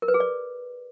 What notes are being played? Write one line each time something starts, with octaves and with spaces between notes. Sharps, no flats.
A#4
B4
G#4
D5